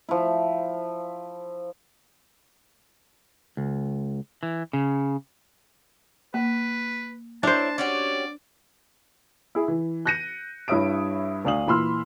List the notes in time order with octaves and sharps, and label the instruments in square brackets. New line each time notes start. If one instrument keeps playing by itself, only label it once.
[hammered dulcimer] F3 E4
[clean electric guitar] C#2
E3
C#3
[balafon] A#3 [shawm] B4
[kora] D4 C5 [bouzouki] E4 A#4 C#5 [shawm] A5
[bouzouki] C#4 F#4 G4 [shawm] D5
[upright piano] E4 G#4
E3
F#6 G6 A#6 C#7 D#7
G2 E4 C#5 E5 D#6 D7
D2 D4 F5 D#6 F#7
A#2 E3 B5 C6 E6 F6